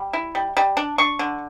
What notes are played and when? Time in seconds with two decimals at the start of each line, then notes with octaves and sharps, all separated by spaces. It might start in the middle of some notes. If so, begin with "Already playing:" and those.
Already playing: G3
0.13 E4
0.35 G3
0.57 G3
0.77 D4
0.98 D4 C#6
1.19 D3